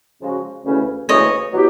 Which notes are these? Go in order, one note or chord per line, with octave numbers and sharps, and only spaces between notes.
C#3 F3 G#3 C#4 F#4
D2 C#3 E3 A3 C#4
D2 C#3 E3 A3 C#4 C#5 D#5
B2 F#3 B3 E4 G4